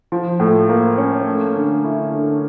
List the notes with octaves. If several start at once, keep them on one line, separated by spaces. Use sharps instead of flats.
F3
A2
A#3
C#4
A3
D3
E4
D3